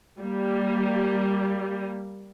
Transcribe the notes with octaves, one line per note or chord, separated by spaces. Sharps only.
G3 A#3